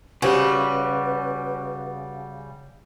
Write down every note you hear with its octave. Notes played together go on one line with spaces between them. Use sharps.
C#3 G3 F#4 G4 B4 C5 G#5